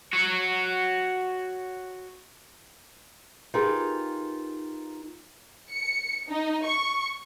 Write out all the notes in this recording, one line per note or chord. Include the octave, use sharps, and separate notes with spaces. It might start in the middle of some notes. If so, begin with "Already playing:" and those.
F#4 C#5
D#4 F4 G4 G#4 A#4 B4
C#7
D#4
C#6